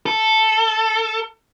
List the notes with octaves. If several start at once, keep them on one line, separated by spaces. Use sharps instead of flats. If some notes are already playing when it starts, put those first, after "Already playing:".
A4